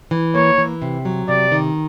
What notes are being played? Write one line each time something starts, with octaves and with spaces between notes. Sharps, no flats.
E3
A#3 C#5
E3
C3
F#3
C3 D5
D#3